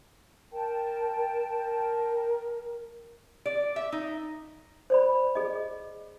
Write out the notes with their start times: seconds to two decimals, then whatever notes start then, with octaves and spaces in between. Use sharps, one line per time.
0.52 A#4 G5 A5
1.56 A#4
3.46 D5
3.76 E5
3.92 D#4
4.90 C5 D5 B5
5.35 G#4 D#5